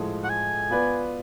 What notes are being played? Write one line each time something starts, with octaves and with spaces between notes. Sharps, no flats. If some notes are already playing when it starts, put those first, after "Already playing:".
Already playing: A2 F3 G#3
F#5
G#5
B3 F4 B4 D5